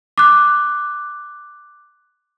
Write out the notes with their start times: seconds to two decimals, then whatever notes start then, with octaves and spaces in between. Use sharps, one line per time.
0.18 D6 F#6